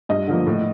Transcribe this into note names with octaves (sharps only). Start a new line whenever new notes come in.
G2 D#5
D3 F3 A#3
A2